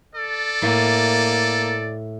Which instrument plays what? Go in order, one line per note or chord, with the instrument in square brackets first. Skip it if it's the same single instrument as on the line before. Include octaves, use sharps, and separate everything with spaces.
[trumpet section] A4 D5
[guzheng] A2 [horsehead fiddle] A#3